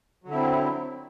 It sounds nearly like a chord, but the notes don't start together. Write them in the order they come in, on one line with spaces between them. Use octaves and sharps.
F#3 D3 E4 C4